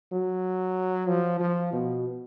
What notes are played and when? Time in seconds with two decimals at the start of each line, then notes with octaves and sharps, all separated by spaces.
0.13 F#3
1.08 F3
1.40 F3
1.72 B2